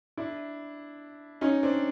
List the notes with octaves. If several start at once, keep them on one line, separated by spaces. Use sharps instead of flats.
D4 E4
C#4 D#4
C4 D4